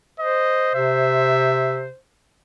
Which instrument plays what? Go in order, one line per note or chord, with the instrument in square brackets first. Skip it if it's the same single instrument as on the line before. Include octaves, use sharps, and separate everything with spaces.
[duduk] C5 [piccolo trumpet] D#5
[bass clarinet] C3 [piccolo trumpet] E5